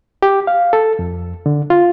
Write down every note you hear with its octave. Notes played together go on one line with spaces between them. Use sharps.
G4
F5
A4
F2
D3
F4